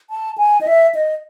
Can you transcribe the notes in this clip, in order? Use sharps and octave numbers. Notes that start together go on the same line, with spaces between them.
A5
G#5
D#5
E5
D#5